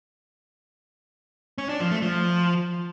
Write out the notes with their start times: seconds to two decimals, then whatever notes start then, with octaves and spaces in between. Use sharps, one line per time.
1.58 C#4
1.69 D4
1.80 F3
1.91 A3
2.02 F3